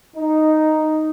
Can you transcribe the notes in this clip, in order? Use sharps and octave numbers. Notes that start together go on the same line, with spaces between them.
D#4